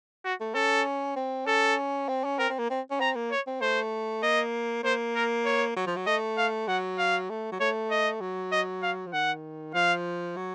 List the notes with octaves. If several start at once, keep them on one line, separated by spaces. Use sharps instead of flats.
F#4
A3
C#4 A4
C4
C#4 A4
C4
C#4
C4 A#4
C4
A#3
C4
C#4
C4 A#5
A#3
C#5
C4
A3 C5
A#3 D#5
A#3 C5
A#4
C#5
F#3
F3
F#3
A3 D#5
F5
F#3 F#5
F5
A3
F#3
A3 C#5
D#5
F#3
D#5
F5
F3
D#3 F#5
F3 F5
F#3